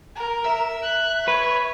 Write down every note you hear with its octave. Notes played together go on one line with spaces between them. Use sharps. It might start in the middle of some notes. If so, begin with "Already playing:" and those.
A#4
E5
F#6
B4 C#5